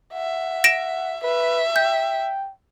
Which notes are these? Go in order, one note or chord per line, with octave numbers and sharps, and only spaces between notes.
E5 F#5
A#6 D7 E7
B4 E5
G5 G6